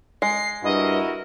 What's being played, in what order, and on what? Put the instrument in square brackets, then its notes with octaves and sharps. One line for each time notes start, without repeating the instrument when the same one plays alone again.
[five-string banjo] G#3 [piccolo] C7
[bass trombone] G2 [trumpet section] E4 F#4 A#4 [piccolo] D#5